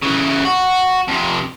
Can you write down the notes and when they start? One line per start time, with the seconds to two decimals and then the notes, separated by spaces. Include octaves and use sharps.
0.02 C#3 E3
0.45 F#4
1.08 F2 C3